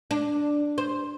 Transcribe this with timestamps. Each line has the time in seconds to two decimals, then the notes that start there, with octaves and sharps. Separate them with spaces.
0.11 D4
0.78 C5